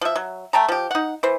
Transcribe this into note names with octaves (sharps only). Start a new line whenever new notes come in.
F3 E5
F#3
A3 G5 A5 A#5
F3 G4
D#4 F#5
E3 C5